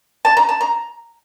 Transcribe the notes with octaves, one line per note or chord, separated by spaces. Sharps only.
A5
A#5
A5
A#5